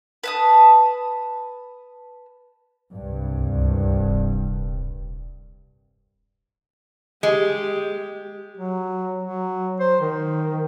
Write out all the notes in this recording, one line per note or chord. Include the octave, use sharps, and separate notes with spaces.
B4 A5 D#6
C2 G2
C#2
D#1
G#3 G4
F#3
F#3
C5
D#3